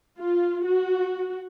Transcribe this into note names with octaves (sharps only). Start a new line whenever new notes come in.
F4
F#4